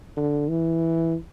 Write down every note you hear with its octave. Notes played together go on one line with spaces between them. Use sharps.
D3
E3